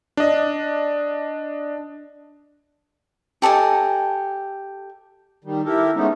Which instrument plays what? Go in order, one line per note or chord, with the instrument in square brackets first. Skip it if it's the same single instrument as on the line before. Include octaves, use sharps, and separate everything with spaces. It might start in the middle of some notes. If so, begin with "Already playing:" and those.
[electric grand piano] D4 D#5
[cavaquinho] G4 A4 D#5 G#5
[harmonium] D#3 G3
E4 G4 A4 A#4
G#3 A3 B3 C#4 D#4